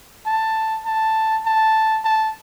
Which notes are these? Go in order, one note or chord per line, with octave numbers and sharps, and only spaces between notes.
A5
A5
A5
A5